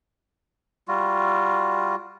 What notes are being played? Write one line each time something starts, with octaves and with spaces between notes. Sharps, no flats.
G3 F4 F#4